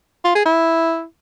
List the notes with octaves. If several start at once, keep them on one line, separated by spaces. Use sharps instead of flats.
F4
G#4
E4